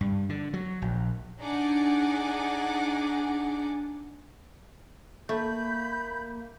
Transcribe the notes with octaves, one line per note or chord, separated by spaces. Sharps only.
G2
D3
F#3
A#1
D4 D#4 G#4 F#5 G#5 D6
A3 A#3 B5 G6